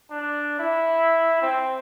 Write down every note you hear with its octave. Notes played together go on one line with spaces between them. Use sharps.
D4
E4
C4